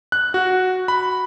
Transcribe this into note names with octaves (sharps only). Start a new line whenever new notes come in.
F#6
F#4
B5